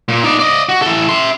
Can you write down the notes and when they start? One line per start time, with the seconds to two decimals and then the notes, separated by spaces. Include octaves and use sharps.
0.08 A#2
0.23 D#4 D5
0.39 D5 D#5
0.69 F#4
0.82 E3 A4
1.09 E5 C6